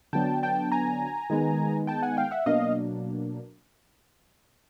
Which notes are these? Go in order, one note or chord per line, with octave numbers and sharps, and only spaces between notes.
D3 F#3 B3 D4 G5 A5
G5 A5
G#5 A#5
D#3 G#3 B3 D#4
G5 A5
F#5 G#5
F5 G5
E5 F#5
B2 F#3 A#3 D4 D#5 F5